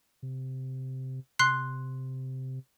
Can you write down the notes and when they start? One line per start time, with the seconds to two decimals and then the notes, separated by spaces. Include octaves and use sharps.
0.23 C3
1.39 C3 C6 F#6 C7